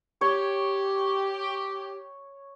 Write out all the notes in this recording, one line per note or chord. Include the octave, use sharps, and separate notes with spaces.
G4 C#5